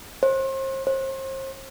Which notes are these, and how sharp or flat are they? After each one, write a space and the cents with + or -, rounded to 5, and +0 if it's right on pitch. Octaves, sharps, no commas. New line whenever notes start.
C5 +35
C5 +35